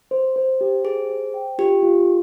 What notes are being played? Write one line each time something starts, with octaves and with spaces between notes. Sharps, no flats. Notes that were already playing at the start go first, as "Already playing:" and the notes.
C5
C5
G4
G#4 C5
C5
G5
F4 G4
F4